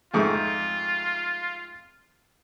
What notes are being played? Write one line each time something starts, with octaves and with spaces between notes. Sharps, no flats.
F2 G#2 A3 F4